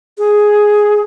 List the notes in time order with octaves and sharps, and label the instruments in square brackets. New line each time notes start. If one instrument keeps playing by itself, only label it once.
[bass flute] G#4